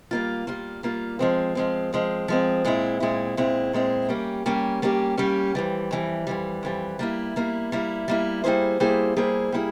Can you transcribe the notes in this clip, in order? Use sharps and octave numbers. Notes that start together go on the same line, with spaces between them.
G3 A#3 F4
G3 A#3 F4
G3 A#3 F4
F3 G#3 C4
F3 G#3 C4
F3 G#3 C4
F3 G#3 C4
A#2 G#3 C4 E4
A#2 G#3 C4 E4
A#2 G#3 C4 E4
A#2 G#3 C4 E4
G3 A#3 C#4 G4
G3 A#3 C#4 G4
G3 A#3 C#4 G4
G3 A#3 C#4 G4
F2 E3 G3
F2 E3 G3
F2 E3 G3
F2 E3 G3
G3 A#3 E4
G3 A#3 E4
G3 A#3 E4
G3 A#3 E4
G3 A#3 E4 G#4 C5
G3 A#3 E4 G#4 C5
G3 A#3 E4 G#4 C5
G3 A#3 E4 G#4